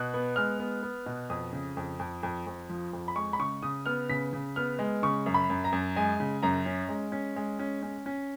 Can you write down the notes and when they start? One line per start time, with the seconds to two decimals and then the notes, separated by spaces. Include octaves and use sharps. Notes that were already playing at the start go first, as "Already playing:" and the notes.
Already playing: B2 F#6
0.14 B3
0.36 G#3 F6
0.60 B3
0.82 B3
1.06 B2
1.30 F2 D#6
1.53 C#3
1.77 F2
1.99 F2
2.23 F2
2.47 F2
2.69 F3
2.93 F2
3.08 B5
3.16 G#3 C#6
3.33 B5
3.39 C#3 C#6
3.63 C#3 D#6
3.86 B3 F6
4.09 C#3 B6
4.33 C#3
4.56 B3 F6
4.79 G#3
5.03 C#3 C#6
5.26 F#2
5.34 B5
5.50 F#2
5.64 A#5
5.72 F#2
5.96 G#3 G#5
6.20 C#3
6.43 F#2 A#5
6.66 C#4
6.89 G#3
7.12 C#4
7.36 G#3
7.59 C#4
7.83 C#4
8.06 C#4